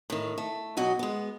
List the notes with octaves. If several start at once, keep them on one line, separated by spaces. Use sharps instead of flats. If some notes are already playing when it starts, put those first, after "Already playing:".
A2 D#3
A3
B2 F#3 F#4 D#5
G#3 B3